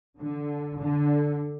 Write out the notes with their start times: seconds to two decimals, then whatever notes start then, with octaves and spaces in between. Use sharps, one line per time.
0.19 D3
0.78 D3